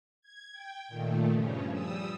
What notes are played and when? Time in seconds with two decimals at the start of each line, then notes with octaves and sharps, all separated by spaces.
0.22 G#6
0.53 G5
0.88 A#2 D#3 A3
1.30 G2 C#3 F3 C#4
1.71 G3 D#6 E6